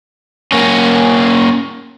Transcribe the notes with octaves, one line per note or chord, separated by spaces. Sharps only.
A#3 C#4